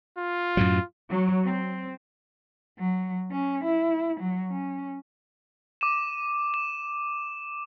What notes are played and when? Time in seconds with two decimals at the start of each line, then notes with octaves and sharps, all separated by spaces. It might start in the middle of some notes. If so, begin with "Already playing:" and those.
0.17 F4
0.57 F#2 A2 F#3
1.10 F#3
1.45 C4
2.79 F#3
3.32 C#4
3.64 E4
4.20 F#3
4.51 C#4
5.81 D6 D#7 E7
6.54 E7